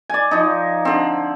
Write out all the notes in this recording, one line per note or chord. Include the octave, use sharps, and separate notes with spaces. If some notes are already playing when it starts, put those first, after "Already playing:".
D5 G#5
F3 D#4
D3 C4